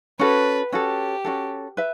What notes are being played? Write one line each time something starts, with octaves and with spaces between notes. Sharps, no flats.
C#4 F#4 A4 B4
C#4 F#4 G4 A4
C#4 F#4 A4
B4 E5